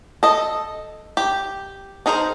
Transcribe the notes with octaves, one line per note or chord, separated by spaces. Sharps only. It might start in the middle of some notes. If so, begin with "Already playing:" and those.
A4 D#5
G4
D4 D#4 G#4 A#4 C5